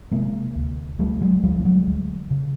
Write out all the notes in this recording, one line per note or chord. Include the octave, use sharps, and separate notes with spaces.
C3 G#3 A#3
D2
D2 G3 A3
F#3 G#3
D2 F3 G3
A3
F#3 G#3
D2
C#3